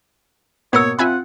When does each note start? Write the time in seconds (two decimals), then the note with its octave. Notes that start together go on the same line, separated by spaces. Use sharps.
0.73 B2 A#3 B3 A#4 C#5 D#6 E6 C#7
0.99 C4 F4 E5 F#5 G#5 B5